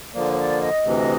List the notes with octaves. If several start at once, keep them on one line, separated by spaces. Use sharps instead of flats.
D3 F3 A#3 D5
C#5
D5
D#5
D2 C3 E3